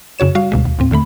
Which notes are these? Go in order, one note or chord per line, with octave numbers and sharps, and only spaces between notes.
F#2 C#3 F#4 C#5 E7
G3 F#4 F5
D2 B2 G#3
D#2
D#2 A2 C4
D#2 D3 A3 B5